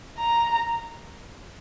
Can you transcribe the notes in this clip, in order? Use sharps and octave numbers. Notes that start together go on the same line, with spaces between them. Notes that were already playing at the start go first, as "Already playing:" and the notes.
A#5